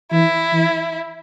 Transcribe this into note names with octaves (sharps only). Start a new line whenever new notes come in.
E3 E4
E3